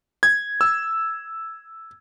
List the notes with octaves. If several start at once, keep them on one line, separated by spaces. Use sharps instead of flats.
G#6
E6